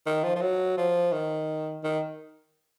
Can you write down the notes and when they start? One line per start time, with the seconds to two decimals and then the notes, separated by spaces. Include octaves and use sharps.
0.06 D#3
0.24 F3
0.36 F3
0.41 F#3
0.78 F3
1.13 D#3
1.84 D#3